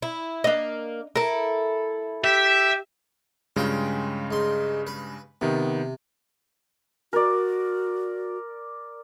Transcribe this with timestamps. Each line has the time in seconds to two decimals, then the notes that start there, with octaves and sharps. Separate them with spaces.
0.02 E4
0.44 A#3 D4 D#5
1.15 E4 A4 A#4
2.24 G4 E5
3.56 G2 C#3 G#3 F4 G5
4.31 G#2 C6
4.87 B4
5.41 C3 D#3 B3
7.13 F#4 A#4 D5